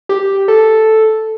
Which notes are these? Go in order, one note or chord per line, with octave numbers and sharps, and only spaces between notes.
G4
A4